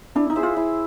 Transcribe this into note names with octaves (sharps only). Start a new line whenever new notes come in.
D4 E4
D#4
G#4 C5 E5
F4
E4